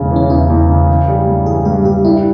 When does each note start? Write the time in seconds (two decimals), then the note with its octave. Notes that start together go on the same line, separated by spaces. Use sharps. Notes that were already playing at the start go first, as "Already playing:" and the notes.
Already playing: E1 C#3
0.11 E3
0.16 C#4
0.30 E2 E4
0.50 E2
0.69 C#3
0.88 E3
1.08 G3
1.28 G2
1.46 E3 G#4
1.65 G2 G4
1.85 G2 G4
2.05 G3 E4